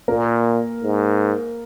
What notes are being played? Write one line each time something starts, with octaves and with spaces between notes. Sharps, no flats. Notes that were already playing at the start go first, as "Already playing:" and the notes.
A#2 A#3 A#4
G#2